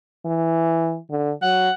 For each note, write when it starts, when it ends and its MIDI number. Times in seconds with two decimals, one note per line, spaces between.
0.26 0.98 52
1.11 1.32 50
1.42 1.69 54
1.42 1.73 78